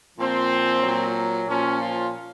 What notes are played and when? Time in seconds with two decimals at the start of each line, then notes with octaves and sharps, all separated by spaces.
0.18 A#2 F3 C4
0.82 A#2 F#3
1.47 A#2 F3 C#4
1.79 F4